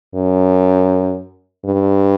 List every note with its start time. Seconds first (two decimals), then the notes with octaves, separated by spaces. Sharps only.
0.15 F#2
1.65 G2